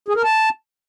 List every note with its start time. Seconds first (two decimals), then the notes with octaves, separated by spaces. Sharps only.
0.08 G#4
0.16 A#4
0.24 A5